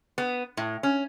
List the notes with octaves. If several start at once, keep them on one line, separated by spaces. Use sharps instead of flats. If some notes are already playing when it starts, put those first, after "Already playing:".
B3
A2
C#4